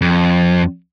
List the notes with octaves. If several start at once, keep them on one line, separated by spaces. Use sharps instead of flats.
F2